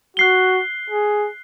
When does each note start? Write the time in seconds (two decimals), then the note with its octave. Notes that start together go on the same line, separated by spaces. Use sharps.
0.17 F#4 F#6 C7 G7
0.90 G#4